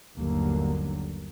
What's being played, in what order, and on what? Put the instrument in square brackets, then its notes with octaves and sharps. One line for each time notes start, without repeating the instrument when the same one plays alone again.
[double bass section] G1 D#2 D3 F#3 A#3